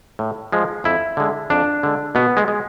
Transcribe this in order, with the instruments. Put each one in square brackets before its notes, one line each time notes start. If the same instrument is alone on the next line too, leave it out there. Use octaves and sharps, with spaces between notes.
[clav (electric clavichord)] A2
F3 G#3
F2 E4
D3 G#3
F2 D4
D3 G#3
B2 B3
G#3
G#3